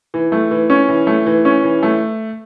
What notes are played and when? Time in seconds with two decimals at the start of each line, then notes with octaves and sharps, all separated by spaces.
0.14 E3
0.32 A3
0.51 E3
0.70 C#4
0.88 E3
1.07 A3
1.26 E3
1.45 C#4
1.64 E3
1.83 A3